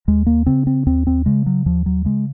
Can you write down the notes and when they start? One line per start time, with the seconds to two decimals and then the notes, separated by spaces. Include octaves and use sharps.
0.08 D#2 G#3
0.26 A#3
0.46 C#3 C4
0.67 C4
0.86 D#2 C4
1.07 C4
1.26 C#3 G#3
1.46 F#3
1.66 D#2 F3
1.86 F#3
2.05 C#3 G#3